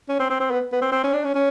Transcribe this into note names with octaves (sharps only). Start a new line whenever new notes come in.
C#4
C4
C4
C4
B3
B3
C4
C4
C#4
D4
C#4
C#4